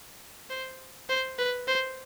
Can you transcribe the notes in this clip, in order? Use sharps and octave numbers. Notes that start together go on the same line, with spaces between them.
C5
C5
B4
C5